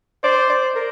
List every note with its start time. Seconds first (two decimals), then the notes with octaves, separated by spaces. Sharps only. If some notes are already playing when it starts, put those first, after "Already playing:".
0.23 C5 D5
0.50 D5
0.75 A#4